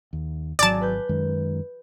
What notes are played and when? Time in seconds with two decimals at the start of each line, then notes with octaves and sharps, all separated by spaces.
0.13 D#2
0.59 G#1 F#3 G#4 D5 A5
0.81 B4 G6
1.09 F#2 D#3 G#3